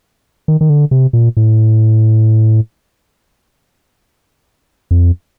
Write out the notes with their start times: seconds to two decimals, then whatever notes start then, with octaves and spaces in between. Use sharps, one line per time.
0.48 D#3
0.61 D#3
0.70 D3
0.91 C3
1.13 A#2
1.37 A2
4.91 F2